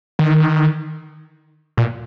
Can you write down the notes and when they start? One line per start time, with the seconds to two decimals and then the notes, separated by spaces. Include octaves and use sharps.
0.19 D#3
1.77 A#2